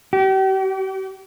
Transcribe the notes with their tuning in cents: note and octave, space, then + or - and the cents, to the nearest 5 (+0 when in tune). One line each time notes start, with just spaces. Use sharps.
G4 -40